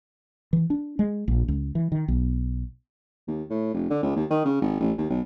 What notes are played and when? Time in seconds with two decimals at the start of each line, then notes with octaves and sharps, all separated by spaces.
0.53 E3
0.70 D4
0.99 G#3
1.28 A#1
1.48 C#2
1.75 E3
1.92 D#3
2.08 B1
3.28 D#2
3.50 A2
3.74 F1
3.90 D3
4.03 C#2
4.16 D#2
4.30 D#3
4.45 C#3
4.62 G#1
4.80 A1
4.98 D#2
5.10 B1